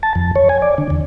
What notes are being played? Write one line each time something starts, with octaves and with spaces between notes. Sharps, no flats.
A5
F2
C#5
G#5
D5
D3
E2